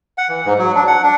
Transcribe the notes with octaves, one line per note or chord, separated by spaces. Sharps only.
F#5
E3
G#2
F#3
D4
F#5
D4